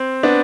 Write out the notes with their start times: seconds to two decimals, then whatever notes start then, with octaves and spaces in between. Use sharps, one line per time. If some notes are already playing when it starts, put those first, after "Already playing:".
Already playing: C4
0.23 B3 D4